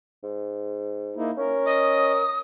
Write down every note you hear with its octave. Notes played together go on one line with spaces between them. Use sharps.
G#2
A#3 D#4 E4
C#4 A#4
D#5 D#6